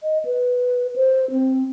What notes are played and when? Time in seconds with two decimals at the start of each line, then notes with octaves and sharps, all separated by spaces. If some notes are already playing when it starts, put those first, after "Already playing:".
0.03 D#5
0.25 B4
0.96 C5
1.31 C4